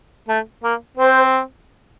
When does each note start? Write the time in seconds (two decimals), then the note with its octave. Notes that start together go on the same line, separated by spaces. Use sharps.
0.29 A3
0.64 A#3
0.98 C4 C5